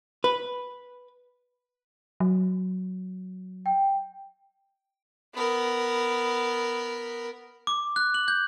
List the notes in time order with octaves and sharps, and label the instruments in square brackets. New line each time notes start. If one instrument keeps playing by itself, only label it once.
[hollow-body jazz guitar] B4
[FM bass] F#3
[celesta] G5
[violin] B3 A#4
[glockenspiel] D6
F#6
F#7
G6